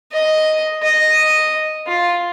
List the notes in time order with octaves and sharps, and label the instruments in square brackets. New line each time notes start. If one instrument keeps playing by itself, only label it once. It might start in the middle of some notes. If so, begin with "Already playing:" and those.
[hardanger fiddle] D#5
D#5
F4